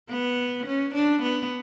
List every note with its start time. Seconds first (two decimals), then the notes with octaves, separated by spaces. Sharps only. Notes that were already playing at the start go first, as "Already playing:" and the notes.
0.10 B3
0.67 C#4
0.95 D4
1.22 B3